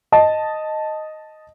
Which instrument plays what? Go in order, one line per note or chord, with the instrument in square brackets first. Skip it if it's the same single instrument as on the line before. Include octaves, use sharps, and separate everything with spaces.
[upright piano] D#5 A5